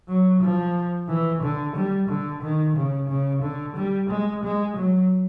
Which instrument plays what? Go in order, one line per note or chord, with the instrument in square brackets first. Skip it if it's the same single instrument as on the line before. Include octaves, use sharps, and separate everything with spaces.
[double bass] F#3
F3
E3
D3
G3
D3
D#3
C#3
C#3
D3
G3
G#3
G#3
F#3